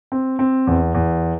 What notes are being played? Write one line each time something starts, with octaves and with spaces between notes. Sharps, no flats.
C4
C4
E2
E2